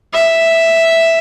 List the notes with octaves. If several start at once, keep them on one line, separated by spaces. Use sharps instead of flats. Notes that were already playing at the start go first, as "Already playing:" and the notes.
E5